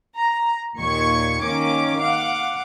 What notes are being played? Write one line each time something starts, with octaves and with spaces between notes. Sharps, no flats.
A#5
D#2 A#2 D#3 C#6 G#6 C#7
D#3 A#3 C#4 D6
F5 F#5 D6